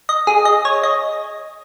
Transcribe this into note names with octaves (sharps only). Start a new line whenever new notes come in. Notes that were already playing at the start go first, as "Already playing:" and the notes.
D#5
G#4
D#5
C#5
D#5